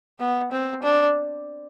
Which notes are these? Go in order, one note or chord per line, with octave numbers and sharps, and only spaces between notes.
B3
C4
D4